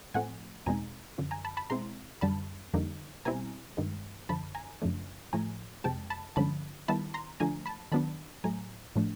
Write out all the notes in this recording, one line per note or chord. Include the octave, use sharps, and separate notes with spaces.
A2 F3 A3 C4 F#5 G#5
E2 B2 G#3 C4 D#4 G#5 A#5
F#2 D3 F3
G#5 A#5
A5 B5
A5 B5
B2 G#3 C4 E4 A#5 C6
F#2 D3 G3 A5 B5
F2 D3 G3 A#3 D#4
B2 G3 C4 E4 G#5 A#5
G2 D#3 G#3
F#2 D3 F3 A5 B5
G#5 A#5
F#2 C#3 F3 A3 D4
A2 F3 A3 G#5 A#5
F2 C3 F3 G#3 G5 A5
A5 B5
G2 D3 F3 G#3 C#4 A5 B5
D#3 G3 B3 E4 A5 B5
A#5 C6
D3 F3 A3 D4 G#5 A#5
A5 B5
D#3 F#3 B3 D4 A5 B5
A2 F#3 A3 G#5 A#5
A2 F3 A3 D4